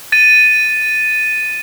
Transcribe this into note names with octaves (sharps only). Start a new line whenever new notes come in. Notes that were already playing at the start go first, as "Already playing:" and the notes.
A6 D#7